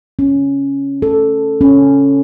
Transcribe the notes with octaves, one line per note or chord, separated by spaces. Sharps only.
C#4
A4
C#4